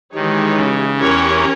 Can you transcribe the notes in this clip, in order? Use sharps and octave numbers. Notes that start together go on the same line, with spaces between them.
D#3 E3 G#3 D#4 G4 C#5
C#3
E2 E3 C#4 G4 A#4 C#5